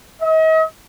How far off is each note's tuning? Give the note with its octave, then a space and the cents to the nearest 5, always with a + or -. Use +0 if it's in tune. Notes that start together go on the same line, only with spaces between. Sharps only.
D#5 +40